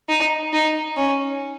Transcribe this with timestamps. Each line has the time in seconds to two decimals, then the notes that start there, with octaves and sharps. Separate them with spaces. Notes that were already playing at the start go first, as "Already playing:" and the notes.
0.09 D#4
0.53 D#4
0.97 C#4